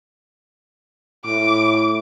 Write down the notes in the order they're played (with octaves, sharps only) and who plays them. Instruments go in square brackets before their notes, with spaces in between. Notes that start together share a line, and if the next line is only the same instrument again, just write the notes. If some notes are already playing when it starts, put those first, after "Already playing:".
[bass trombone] A2 [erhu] D6